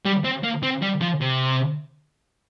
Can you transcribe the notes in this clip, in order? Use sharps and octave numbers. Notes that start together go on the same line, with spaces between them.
G3
C4
A#3
C4
G3
F3
C3